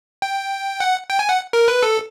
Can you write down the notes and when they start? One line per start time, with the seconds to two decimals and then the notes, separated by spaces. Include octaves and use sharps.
0.22 G5
0.80 F#5
1.10 G5
1.19 G#5
1.29 F#5
1.53 A#4
1.68 B4
1.83 A4